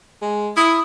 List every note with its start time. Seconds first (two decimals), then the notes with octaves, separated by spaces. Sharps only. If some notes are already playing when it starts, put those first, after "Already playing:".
0.22 G#3
0.56 E4 D#6